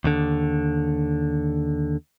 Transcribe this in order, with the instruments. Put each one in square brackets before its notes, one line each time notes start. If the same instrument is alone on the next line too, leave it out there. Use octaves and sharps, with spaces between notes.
[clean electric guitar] D#2 D3